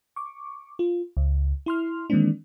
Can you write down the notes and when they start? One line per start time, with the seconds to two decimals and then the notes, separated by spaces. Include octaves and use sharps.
0.16 C#6 D6
0.79 F4
1.17 C#2
1.66 E4 C6 F6
2.10 D#3 E3 G#3 A#3 C4 D4